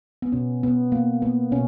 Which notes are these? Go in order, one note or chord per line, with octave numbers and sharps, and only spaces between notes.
B3
B2 C#4
B2 B3
A#3
A#3 B3
B2 C#4